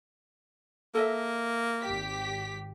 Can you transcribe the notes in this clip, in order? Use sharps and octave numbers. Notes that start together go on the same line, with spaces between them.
A#3 A4 D#5 E5
G#1 G4 B6